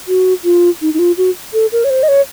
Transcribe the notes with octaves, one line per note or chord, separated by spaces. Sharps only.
F#4
F4
D#4
D#4
F4
F#4
A4
A#4
C#5
C5
D#5
C#5